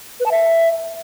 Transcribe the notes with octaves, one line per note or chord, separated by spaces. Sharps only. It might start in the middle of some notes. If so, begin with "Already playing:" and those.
B4
A5
E5